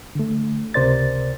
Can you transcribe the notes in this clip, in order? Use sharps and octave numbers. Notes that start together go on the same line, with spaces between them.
D3 A3
C#2 C3 A#4 C5 D5 A6